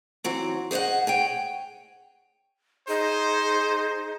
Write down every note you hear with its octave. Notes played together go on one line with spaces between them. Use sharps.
E3 F#3 C4
G#4 C5 C#5 D#5 F#5
G#4 C#5 G5
D#4 G#4 C5